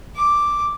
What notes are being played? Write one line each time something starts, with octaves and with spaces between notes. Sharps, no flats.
D6